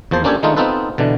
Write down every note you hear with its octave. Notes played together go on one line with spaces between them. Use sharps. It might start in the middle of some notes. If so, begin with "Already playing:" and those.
E2 F3 A#3 C5 A5
A#3 C#4 D4 G4 A4 C#5
D#3 G#3 A3 D4 D#4 F4
B3 C4 D#4 F4 A4 B4
B2 D3 E3 D4